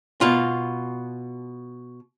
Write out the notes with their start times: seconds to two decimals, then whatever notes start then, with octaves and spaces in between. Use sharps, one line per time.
0.21 B2 F4